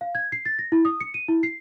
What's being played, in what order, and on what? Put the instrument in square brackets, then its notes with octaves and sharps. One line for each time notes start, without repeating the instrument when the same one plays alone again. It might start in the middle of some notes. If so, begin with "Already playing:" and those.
[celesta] F5
G#6
C7
A6
A#6
E4
D#6
C#7
D#7
E4
C7